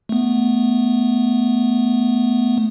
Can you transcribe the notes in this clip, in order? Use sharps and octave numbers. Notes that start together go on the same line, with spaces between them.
A3 B3